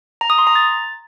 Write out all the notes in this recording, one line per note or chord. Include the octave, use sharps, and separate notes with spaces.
A#5
D#6
C6
A#5
A6